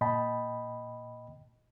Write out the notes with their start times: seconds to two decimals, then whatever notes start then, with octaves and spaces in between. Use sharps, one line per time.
0.01 A#2 D#5 G5 A5 B5